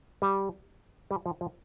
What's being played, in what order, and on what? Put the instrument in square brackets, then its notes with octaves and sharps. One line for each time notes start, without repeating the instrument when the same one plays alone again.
[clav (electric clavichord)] G3
G3
F3
F3